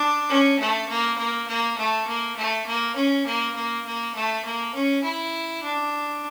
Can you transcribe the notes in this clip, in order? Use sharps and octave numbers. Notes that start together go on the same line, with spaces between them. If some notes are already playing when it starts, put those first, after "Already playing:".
Already playing: D4
C#4
A3
A#3
A#3
A#3
A3
A#3
A3
A#3
C#4
A#3
A#3
A#3
A3
A#3
C#4
E4
D4